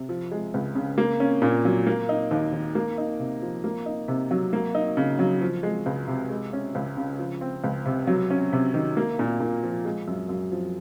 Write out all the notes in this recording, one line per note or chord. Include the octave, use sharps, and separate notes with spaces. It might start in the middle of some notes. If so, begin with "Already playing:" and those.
Already playing: C3
F3
G#3
C#2
C#3
A#3
C#4
A#2
F#3
A#3
D#4
D#2
D#3
A#3
D#4
C3
F3
A#3
D#4
C3
F#3
A#3
D#4
C#3
F#3
F3
G#3
C#2
C3
G#3
C#4
C#2
C#3
F3
C4
C#2
C3
F#3
C#4
C3
D#3
A#3
A#2
A#2
F3
G#3
F#2
F#2
F3